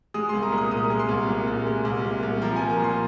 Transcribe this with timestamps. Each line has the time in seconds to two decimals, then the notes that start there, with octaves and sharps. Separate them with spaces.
0.14 G#3 D#6
0.29 C2 C6
0.43 A#5
0.52 A#2
0.58 D#6
0.71 C2 D#6
0.90 G#3
0.99 C6
1.09 C2
1.28 A#2
1.47 C2
1.66 G#3
1.85 C2
2.04 A#2
2.23 C2
2.42 F3 A#5
2.56 A#3 G#5
2.70 A#5
2.79 A#2 C6